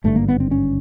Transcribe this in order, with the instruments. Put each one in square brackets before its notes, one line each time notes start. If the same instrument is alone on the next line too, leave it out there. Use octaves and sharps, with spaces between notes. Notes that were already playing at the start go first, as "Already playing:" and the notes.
[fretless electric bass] G#1 G2 D3 A3
A#3
B3
C4
C#4